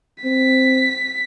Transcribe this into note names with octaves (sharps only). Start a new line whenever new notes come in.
C4 B6